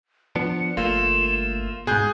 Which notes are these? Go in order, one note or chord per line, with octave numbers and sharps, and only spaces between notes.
F3 B3 D4 C#7
G1 A3 A#3 F4 E7
G#2 B2 G#4 F#6 G6